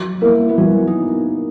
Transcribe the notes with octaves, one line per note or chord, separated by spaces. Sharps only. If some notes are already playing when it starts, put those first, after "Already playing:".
Already playing: F#3
A#3 E4
B3
F#3 C#4
D#4